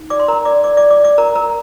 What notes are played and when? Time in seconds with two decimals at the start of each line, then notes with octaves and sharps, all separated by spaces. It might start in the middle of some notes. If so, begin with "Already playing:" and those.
Already playing: D#4
0.10 D5 D6
0.19 C6
0.28 A#4 A#5
0.45 D5 D6
0.64 D5 D6
0.77 D5 D6
0.91 D5 D6
1.04 D5 D6
1.18 A#4 A#5
1.35 A#4 A#5